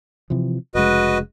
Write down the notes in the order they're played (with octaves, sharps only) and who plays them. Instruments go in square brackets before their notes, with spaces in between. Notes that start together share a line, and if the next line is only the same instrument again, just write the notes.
[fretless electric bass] C3 E3 F3
[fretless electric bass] F1 C#3 G#3 [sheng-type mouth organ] F#4 B4 D#5